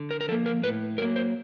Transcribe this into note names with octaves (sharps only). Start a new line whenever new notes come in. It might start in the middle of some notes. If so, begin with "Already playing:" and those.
Already playing: D3
A#4
A#4
F3 A#3 A4
A#4
A2 B4
F#3 A#3 A#4
C5